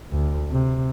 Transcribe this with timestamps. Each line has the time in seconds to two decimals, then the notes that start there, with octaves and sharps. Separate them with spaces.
0.12 D2
0.51 C3